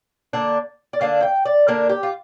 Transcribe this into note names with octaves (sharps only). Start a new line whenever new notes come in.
D3 A#3 D4
D5
D3 A#3 D4 F5
G5
D5
D3 A#3 D4 A#4
G4
F4